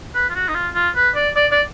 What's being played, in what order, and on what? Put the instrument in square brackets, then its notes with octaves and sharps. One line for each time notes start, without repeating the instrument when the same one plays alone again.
[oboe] B4
F4
F#4
D#4
F4
F4
B4
D5
D5
D5